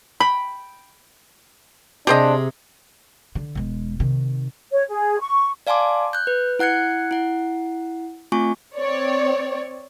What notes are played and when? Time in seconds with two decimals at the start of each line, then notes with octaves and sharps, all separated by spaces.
0.20 G5 B5
2.07 C3 D4 G4 G#4 C5 D#5 A#5
3.35 D3
3.55 E1 G#3
4.00 C3 D#3
4.71 C#5
4.89 G#4
5.19 C#6
5.67 D5 F5 G#5 A5 C6 D6
6.13 F#6 G6
6.27 B4
6.59 E4 F#5 F#6 G#6 C#7
7.11 E4 F#5
8.32 A3 C4 F4 G#5 C#6
8.75 C4 C#5 D5